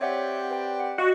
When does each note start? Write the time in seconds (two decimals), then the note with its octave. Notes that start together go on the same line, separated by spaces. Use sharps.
0.01 C4 G4 C#5 D5 E5 F#5
0.51 B4 G5
0.80 F#5
0.98 F#4 D#5 F5 C#6